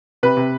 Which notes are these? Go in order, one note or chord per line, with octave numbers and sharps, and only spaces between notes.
C3 B4
C3